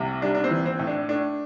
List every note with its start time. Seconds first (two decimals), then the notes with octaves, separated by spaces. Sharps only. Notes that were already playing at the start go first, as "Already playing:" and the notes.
Already playing: C2 C3
0.22 G3 D4
0.35 D4
0.44 C4
0.51 E3
0.66 C4
0.79 A2
0.87 D4
1.08 A3 D4